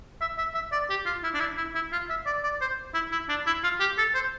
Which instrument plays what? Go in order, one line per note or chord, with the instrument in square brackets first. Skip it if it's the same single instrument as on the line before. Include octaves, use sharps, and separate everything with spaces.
[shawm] E5
E5
E5
D5
G4
F4
E4
D4
E4
E4
E4
F4
E5
D5
D5
C5
E4
E4
D4
E4
F4
G4
A4
C5